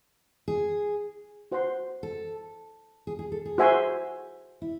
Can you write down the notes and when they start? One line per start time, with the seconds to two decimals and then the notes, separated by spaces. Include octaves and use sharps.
0.48 G#4
1.52 F#4 C5 F#5 C6
2.03 A4
3.07 G#4
3.19 G#4
3.32 A4
3.45 G#4
3.58 F#4 C5 E5 G#5 C6
4.62 E4